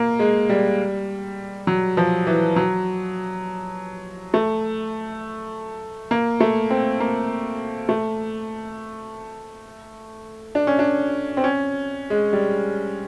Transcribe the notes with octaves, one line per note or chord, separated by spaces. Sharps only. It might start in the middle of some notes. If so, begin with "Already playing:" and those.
Already playing: A#3
G#3
G3
F#3
F3
E3
F#3
A3
A#3
A3
C4
A#3
A3
D4
C#4
D4
C4
C#4
G#3
G3